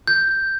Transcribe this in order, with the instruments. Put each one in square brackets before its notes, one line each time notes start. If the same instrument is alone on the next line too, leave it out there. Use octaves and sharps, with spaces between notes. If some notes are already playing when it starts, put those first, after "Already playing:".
[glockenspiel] G6